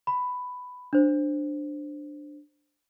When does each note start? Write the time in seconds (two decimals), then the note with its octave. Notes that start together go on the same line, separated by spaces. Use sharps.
0.07 B5
0.93 D4 C5